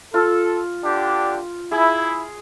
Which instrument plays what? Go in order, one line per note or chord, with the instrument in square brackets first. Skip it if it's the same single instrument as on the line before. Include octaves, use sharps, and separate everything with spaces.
[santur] F4 [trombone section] A4
[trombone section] D3 D4 G4
[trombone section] E4 [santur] G#4